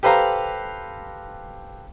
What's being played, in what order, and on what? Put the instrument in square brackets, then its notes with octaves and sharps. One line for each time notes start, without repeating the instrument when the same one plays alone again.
[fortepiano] G4 A4 B4 C5 F5 A#5